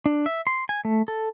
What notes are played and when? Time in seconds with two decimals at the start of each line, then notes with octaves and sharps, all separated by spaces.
0.06 D4
0.26 E5
0.47 C6
0.69 G#5
0.85 A3
1.08 A4